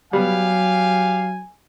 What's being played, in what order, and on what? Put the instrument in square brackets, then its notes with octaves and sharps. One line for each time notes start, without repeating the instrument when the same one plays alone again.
[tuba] F#3 [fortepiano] G3 B3 [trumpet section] G4 F5 [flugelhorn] G#5